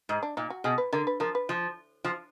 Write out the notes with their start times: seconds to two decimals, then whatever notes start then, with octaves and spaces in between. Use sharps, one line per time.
0.09 G#2
0.23 D4
0.37 A#2 D#4
0.50 F#4
0.64 B2 G#4
0.78 B4
0.93 D3 A#4
1.07 B4
1.20 F3 A#4
1.35 B4
1.49 F3
2.04 F3